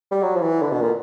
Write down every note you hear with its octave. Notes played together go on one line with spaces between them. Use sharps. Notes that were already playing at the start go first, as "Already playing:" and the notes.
G3
F#3
F3
E3
D3
B2
A#2